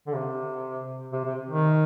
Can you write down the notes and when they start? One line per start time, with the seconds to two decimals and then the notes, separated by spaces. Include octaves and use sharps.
0.07 D3
0.14 C3
1.12 C3
1.24 C3
1.49 D#3